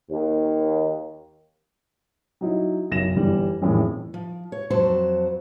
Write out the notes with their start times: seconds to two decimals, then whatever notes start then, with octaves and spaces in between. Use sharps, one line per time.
0.10 D#2
2.41 F#3 D#4 E4
2.91 F#1 B1 A#6 E7
3.16 G1 E3 G3
3.62 A1 F2 A2 D#3 E3 G#3
4.14 F3
4.52 C#5
4.70 F2 F#3 C5 A5